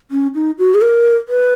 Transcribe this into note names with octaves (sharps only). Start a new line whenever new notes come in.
C#4
D#4
F#4
G#4
A#4
B4